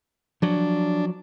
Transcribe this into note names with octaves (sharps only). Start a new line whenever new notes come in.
F3 F#3 D4